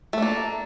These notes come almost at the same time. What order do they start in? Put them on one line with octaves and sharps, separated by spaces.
A3 D4 A#3